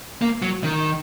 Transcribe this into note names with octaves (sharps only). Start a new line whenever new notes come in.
A#3
F#3
D#3